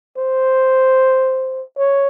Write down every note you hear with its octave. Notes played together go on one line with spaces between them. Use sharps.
C5
C#5